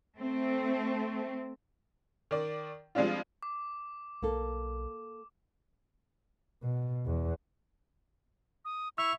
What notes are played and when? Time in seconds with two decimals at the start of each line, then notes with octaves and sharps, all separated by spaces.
0.18 A3 C4
2.31 D#3 D5
2.95 F3 G3 G#3 C4 D4 F4
3.43 D6
4.22 B1 A#3 A4
6.63 B2
7.06 E2
8.65 D#6
8.98 E4 E5 C#6 E6 F7